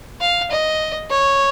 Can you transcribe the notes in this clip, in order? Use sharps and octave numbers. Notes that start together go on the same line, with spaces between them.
F5
D#5
C#5